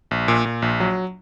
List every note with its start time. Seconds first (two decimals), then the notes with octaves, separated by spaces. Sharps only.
0.11 A#1
0.28 A#2
0.45 A#2
0.62 A#1
0.80 F#3